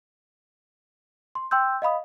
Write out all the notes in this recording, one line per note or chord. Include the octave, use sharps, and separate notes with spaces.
C6
G5 C6 E6 G6
D#5 F5 B5 D#6